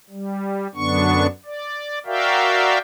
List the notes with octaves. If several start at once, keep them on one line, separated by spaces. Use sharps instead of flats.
G3
F#2 D3 B3 D4 C#6
D5
F#4 A#4 D5 E5 F5 G5